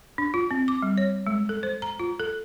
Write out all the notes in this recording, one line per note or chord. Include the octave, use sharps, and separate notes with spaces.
D4
F4
C4
D6
G3
C#5
G#3
A4
C5
A#5
F4
A4